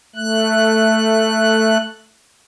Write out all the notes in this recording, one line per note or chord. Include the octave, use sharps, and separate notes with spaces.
A3 F#6